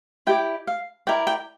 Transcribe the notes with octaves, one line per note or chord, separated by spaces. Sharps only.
E4 G4 D5 G5
F5
E4 A#4 D5 G5
G5